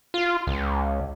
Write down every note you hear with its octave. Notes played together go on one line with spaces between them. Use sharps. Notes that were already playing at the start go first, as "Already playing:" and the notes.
F4
C#2